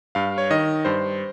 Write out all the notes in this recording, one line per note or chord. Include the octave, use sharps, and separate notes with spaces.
G2 F5
C#5
D#3 D#5
G2 C5